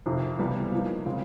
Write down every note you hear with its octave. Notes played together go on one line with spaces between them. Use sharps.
F2 C3 D#3
C#2 C3 E3 G3 B3
F3 A#3 D#4
C#3 E3 G#3 C4